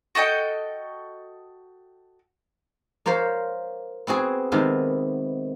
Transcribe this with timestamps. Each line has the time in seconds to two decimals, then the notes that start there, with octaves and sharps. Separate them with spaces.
0.15 F#4 A4 D#5 G5
3.06 A#3 F4 A#4 C5 C#5
4.07 B3 C4 F#4 G#4
4.52 C3 D#3 G#3 B3